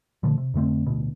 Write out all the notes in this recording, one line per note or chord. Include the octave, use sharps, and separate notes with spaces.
A#2 D3 F3 A3
C3
F2 D3 A3 C4
D1 D2 B2